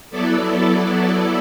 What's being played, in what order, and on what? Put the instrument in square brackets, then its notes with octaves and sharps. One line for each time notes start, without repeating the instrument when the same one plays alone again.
[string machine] F#3 B3 E4 A4 D5